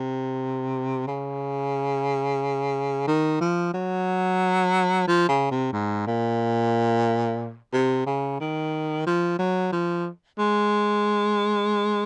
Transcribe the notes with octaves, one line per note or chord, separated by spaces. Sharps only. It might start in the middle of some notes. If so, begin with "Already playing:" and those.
Already playing: C3
C#3
D#3
F3
F#3
F3
C#3
C3
G#2
A#2
C3
C#3
D#3
F3
F#3
F3
G#3